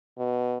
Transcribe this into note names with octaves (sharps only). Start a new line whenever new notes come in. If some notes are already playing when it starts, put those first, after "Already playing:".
B2